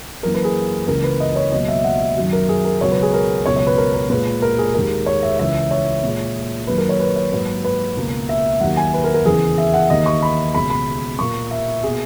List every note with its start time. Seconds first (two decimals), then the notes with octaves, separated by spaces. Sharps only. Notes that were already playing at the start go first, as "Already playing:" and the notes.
0.23 F#2 E3 A#3 A#4
0.34 B4
0.44 G#4
0.87 C#2 C#3 E3 A#3 A#4
1.04 B4
1.20 D#5
1.36 C#5
1.52 C#2 B2 F#3 A#3 D#5
1.68 E5
1.84 F#5
2.17 F#2 D#3 F#3
2.33 A#4
2.49 G#4
2.65 A#4
2.81 C#2 B2 F#3 C#5
2.92 B4
3.02 G#4
3.13 A#4
3.45 C#2 B2 F#3 C#5
3.56 C#5
3.67 B4
3.78 A#4
3.94 A#4
4.10 A#2 G#3 B4
4.42 A#4
4.58 G#4
4.74 D#2 D#3 G#3 A#4
5.06 C#5
5.23 E5
5.39 C#2 C#3 E3 E5
5.71 C#5
6.03 A#2 G#3
6.67 F#2 D#3 F#3 A#3 B4
6.78 A#4
6.89 C#5
7.00 B4
7.16 C#5
7.32 G#2 F#3 A#3 B4
7.64 B4
7.97 C#2 B2 A#3
8.29 E5
8.61 D#2 D#3 F#3 A#3 F#5
8.77 G#5
8.94 B4
9.04 A#4
9.14 A#4
9.25 E2 C#3 E3 G#4
9.58 E5
9.74 F#5
9.90 D#2 D#3 A#3 D#5
10.06 C#6
10.22 B5
10.54 C#2 B2 G#3 B5
10.70 B5
11.19 A#2 A#3 C#6
11.51 E5
11.83 B2 A#3 G#4